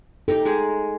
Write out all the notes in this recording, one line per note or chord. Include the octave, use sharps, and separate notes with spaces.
D#4 G4 A4
G#3 G#4